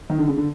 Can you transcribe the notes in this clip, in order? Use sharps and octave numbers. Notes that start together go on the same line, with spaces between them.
D#3
D3
C#3
D3